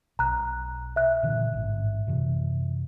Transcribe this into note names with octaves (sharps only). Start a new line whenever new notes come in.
B1 A#5 F#6
E5 F#6
A#2 D3 E3
A1 G#2
F#2 C3 E3